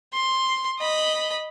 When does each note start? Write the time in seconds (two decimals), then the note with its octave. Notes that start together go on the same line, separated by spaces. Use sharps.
0.13 C6
0.79 D#5 B5